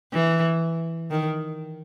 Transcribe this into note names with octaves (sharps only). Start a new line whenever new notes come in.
E3
D#3